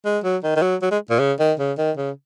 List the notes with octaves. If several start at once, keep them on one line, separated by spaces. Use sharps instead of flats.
G#3
F#3
D#3
D#3
F#3
F#3
G#3
A#2
C#3
D#3
C#3
D#3
C#3